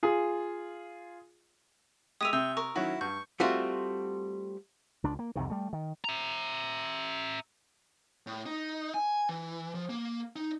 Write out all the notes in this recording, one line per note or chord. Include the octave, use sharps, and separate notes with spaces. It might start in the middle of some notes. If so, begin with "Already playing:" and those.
F4 G#4
G#3 G4 E5 D#6 D#7 F7
C3 E5 G5 E6
A#4 C#6
D#3 F#3 C#4 E4 F#4
G2 C#6 G6
G3 A3 C4 F4 F#4
C#2 D4
A#3
C2 F2 C3 D#3
G3 A3
D#3
E5 A#5
A2
D#4
G#5
E3
F3
A#3
D#4